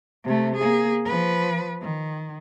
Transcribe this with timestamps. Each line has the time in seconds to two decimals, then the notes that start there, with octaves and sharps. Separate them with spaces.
0.24 C3 A3
0.56 A#3 G#4
1.06 F3 B4
1.82 D#3